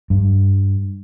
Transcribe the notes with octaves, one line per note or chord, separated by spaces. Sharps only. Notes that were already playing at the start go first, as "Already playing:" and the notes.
G2